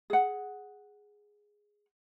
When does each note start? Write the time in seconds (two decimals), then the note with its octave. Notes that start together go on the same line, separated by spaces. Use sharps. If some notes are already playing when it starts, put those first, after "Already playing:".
0.10 G#4 F#5